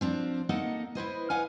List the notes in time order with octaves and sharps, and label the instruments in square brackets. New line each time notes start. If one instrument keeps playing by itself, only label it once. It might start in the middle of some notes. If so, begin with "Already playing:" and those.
[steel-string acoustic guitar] F3 C4 D4
A#3 D#4 A4 D#5 F#5
E4 B4 C5 D#5
B4 D#5 F5 F#5 G#5